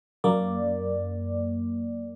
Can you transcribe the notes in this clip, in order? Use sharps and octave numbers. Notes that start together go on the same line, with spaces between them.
F#2 A#3 D5